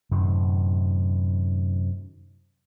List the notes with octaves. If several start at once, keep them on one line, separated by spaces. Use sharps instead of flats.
F#2 A2 C3 D#3